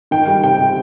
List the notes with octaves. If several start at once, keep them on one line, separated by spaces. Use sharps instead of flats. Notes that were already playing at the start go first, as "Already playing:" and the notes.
D#3 G5
G3
C3 G5
C3